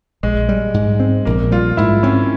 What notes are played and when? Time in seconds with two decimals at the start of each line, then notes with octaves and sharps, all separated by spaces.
0.23 A#1 G#3
0.49 G3
0.74 G#2
1.00 C4
1.25 A#1 A#3
1.52 G3 F4
1.77 G#2 E4
2.03 C4 C#4